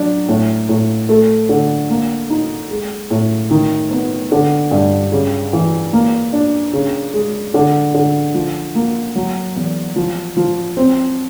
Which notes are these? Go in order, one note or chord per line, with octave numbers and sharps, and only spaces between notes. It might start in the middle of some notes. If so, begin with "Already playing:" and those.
Already playing: F#3 D4
A2
A2
A3
D3
A#3
D#4
G#3
A2
D#3
B3
D3
G2
C#3
E3
A#3
D4
C#3
G#3
D3
D3
F3
A#3
F#3
E2
F3
F3
C4